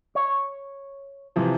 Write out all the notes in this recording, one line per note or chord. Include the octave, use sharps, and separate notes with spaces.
C#5
C3 E3 F3